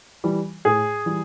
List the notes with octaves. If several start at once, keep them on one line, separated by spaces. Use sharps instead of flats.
E3 G3
A2 G#4
E3 G3